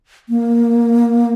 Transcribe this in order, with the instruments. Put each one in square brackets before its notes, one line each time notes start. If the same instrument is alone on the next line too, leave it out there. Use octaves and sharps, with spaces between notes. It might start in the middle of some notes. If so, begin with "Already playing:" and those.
[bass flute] A#3